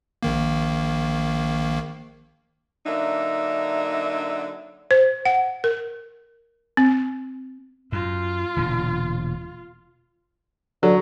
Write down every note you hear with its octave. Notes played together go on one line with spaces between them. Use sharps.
A#1 D#3 A#3
D3 F#3 A#3 D4 D#4 E5
C5
F#5
A#4
C4
F#2 F4
E1 A#2 D3
D3 F#3